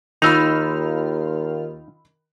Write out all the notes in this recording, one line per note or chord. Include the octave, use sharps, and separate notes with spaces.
D#2 D#3 D#4 F4 B5 E6 F6 F7